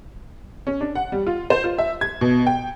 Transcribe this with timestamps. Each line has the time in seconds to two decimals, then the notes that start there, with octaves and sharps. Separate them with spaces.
0.67 C#4
0.81 D4
0.95 F#5
1.12 G3
1.27 F4
1.50 C5
1.64 F4
1.78 E5
2.01 G#6
2.21 B2
2.46 G5